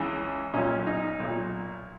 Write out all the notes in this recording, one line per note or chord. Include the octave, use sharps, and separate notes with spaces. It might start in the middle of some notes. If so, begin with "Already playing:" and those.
Already playing: C#2 C#3 E3
B1 A#2 C#4
D#4
B1
A#2